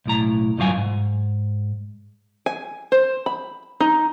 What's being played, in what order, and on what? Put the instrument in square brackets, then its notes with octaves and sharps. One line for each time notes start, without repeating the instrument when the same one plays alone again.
[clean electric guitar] B1 A2 A#5
B1 G2 F3 F#3 F5 G#5
G#2
[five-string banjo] G#5
C5
B5
D#4